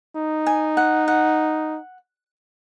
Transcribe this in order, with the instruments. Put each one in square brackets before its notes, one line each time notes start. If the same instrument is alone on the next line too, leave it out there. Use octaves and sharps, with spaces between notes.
[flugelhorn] D#4
[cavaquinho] G#5
F#5
F#5